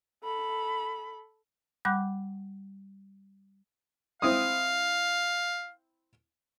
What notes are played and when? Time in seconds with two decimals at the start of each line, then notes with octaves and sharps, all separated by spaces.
0.24 A4 B5
1.85 G3 F#5 B5 D6 F#6 G6
4.22 C4 E4 F5 D#6